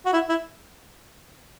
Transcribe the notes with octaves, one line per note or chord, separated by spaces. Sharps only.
F#4
E4
E4